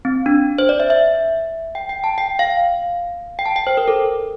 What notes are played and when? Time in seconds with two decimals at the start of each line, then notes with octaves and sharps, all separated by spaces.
0.05 C4
0.26 D4
0.58 C5
0.69 D5
0.80 E5
0.90 E5
1.75 G5
1.89 G5
2.04 A5
2.18 G5
2.39 F5
3.39 G5
3.46 A5
3.56 G5
3.67 C5
3.77 A#4
3.88 A4